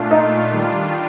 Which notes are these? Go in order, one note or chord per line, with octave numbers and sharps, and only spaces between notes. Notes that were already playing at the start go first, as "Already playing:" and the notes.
Already playing: A#2 A3 D4 F4
D#4
D#3 G3 D4 F4